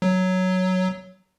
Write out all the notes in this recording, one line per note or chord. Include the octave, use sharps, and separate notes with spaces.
F#3